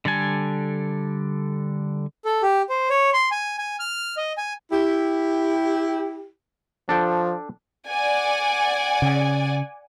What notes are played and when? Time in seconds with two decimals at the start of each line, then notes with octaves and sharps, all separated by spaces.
0.05 D3 G3 A4 G#5
2.25 A4
2.42 G4
2.69 C5
2.90 C#5
3.13 C6
3.31 G#5
3.58 G#5
3.79 F6
4.17 D#5
4.37 G#5
4.72 E4 G4
6.89 F3 D4 A4 G5
7.89 D5 F#5 G#5
9.02 C#3